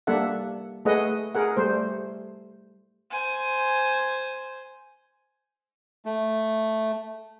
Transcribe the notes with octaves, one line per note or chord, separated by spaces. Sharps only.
G3 A#3 D4 A4 E5 F#5
A3 G#4 B4 D#5 F#5
G#4 A#4 F#5
G3 A3 C5
C5 G#5
A3